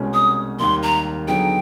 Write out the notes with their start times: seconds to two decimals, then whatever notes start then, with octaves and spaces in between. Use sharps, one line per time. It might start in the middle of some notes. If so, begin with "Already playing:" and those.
Already playing: C2 B2 G#3 C#4
0.14 D#6
0.59 D#2 D#3 G3 A#3 C6
0.82 A#5
1.28 D3 F#3 B3 D#4 G#4 G5